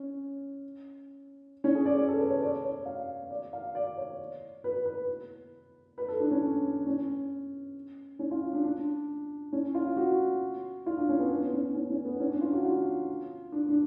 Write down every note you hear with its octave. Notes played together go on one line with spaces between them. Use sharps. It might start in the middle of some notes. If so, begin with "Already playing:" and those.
Already playing: C#4
C#4
G#4
D5
D5
A4
B4
C#5
D5
C#5
F5
D5
F5
D5
C#5
B4
B4
B4
A4
D4
C#4
C#4
C#4
F4
D4
D4
C#4
F4
F#4
F4
D4
C#4
B3
B3
C#4
C#4
C#4
B3
C#4
D4
F4
F#4
F4
D4
D4